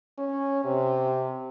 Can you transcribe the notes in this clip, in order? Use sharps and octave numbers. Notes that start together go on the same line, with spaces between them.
C#4
C3